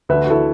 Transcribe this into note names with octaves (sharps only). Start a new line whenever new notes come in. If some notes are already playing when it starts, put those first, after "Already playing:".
D2 D3 B4 E5
F#4
E4 A4